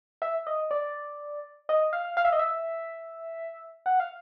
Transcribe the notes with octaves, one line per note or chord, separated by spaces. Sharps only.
E5
D#5
D5
D#5
F5
F5
E5
D#5
E5
F#5
F5